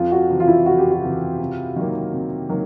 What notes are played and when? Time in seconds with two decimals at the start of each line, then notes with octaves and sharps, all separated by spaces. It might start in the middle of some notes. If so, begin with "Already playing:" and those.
Already playing: F2 F4
0.12 F#4
0.29 C3 E3
0.40 F4
0.47 E4
0.66 F2 F#4
0.78 G4
0.91 F#4
1.02 C3 E3
1.39 C3
1.76 D#3 F#3 A#3
2.13 C3
2.49 D#3 F#3 A#3